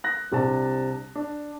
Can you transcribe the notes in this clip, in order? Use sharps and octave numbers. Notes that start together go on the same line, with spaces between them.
F#6 A#6
C2 C3 D4 A5
D4